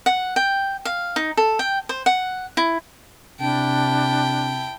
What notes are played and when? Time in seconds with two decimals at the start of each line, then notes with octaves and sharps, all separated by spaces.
0.06 F#5
0.36 G5
0.85 F5
1.16 D#4
1.37 A4
1.59 G5
1.89 C5
2.06 F#5
2.57 E4
3.40 C3 D4 E4 G5 A5